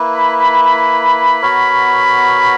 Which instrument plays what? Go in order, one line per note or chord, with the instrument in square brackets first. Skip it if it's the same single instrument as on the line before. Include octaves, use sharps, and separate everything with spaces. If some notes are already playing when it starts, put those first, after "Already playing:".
Already playing: [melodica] A#3 E4 B4
[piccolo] B5
B5
B5
[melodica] B3 F#4 A#4 C#5